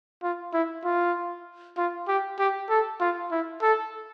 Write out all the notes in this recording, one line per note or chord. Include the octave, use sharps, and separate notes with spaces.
F4
E4
F4
F4
G4
G4
A4
F4
E4
A4